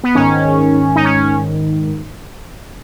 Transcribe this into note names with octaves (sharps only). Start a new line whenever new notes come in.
B3
G#2 D#3 C#4
D#4
C#4